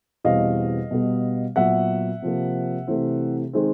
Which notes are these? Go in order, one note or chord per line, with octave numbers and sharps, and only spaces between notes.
E2 B2 G3 C4 D#5 F5
B2 G3 B3
A#2 F#3 B3 E5 F#5
C3 F3 A#3
C3 E3 A3 C4
D#3 G#3 C4